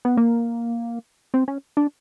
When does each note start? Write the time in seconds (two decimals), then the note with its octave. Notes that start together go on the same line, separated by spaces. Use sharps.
0.05 B3
0.17 A#3
1.34 C4
1.48 C#4
1.77 D4